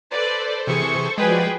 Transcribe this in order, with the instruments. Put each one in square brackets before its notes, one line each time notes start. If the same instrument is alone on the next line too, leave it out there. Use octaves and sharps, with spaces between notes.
[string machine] A4 C5 [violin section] B4 D5
[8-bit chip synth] C3 E3 G#4 [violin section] C#6
[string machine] F3 F#4 D5 [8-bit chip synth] G#3 [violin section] G#4 B4 G5